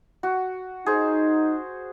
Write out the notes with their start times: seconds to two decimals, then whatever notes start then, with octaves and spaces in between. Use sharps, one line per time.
0.23 F#4
0.86 D#4 G#4 C5